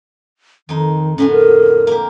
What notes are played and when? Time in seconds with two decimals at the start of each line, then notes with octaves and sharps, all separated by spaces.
0.69 F2 D#3 D#4
1.18 A2 D3 B3 C#4
1.32 A#4
1.87 A#3 G4